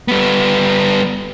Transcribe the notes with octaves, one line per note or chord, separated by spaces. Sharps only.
G3 B3